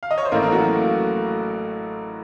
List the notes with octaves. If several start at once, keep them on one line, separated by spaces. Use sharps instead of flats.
F5
D#5
C#5
C5
A1 A2 A3 A#3 A#4
A#3 A#4
F#3 F#4